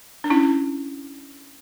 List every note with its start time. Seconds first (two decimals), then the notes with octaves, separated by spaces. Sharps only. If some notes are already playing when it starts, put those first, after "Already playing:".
0.24 D4
0.30 C#4 E4